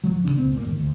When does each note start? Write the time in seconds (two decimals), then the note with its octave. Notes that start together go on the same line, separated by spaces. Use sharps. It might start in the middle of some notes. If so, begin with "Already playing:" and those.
0.04 D1 E2 F3 F#3
0.25 D#1 G2 C#3 D4
0.37 C#2 A#2 C4
0.52 A#2 A#3
0.65 G1 D#2
0.80 D2